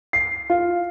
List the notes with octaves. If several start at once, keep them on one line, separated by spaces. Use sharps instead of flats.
C7
F4